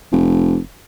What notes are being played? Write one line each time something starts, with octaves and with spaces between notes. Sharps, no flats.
F1